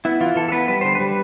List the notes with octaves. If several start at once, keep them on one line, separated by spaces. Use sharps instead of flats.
B3 E4
E3 F4
E3 A4
A4
B3 B4
G3 B4
D3 C5
G3 B4